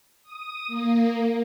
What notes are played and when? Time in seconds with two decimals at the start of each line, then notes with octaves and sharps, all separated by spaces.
0.23 D#6
0.67 A#3